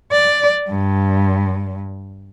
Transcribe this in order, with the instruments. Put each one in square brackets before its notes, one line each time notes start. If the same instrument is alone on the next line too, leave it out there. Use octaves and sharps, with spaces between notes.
[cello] D5
G2